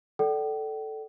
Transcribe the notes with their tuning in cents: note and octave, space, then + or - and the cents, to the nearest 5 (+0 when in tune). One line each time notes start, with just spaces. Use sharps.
A4 +0 D5 +0 G5 -45